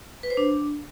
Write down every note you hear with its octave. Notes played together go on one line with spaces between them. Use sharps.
B4
C5
D4